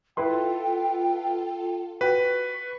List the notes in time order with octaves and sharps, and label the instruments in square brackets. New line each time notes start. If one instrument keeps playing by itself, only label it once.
[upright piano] E4 B4 C6 [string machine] F4 A4 [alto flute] G5
[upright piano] F#4 G5 [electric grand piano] B4 [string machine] C#6